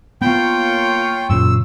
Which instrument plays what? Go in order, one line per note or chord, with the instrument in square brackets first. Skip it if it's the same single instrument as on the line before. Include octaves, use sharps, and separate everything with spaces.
[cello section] A#3 F4 C#5 [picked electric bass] B3 [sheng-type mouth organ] G5
[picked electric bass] F#1 A#2 C#3 [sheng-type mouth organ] E6